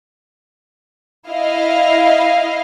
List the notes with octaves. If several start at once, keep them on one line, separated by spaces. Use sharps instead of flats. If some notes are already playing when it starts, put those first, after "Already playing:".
E4 D#5 F5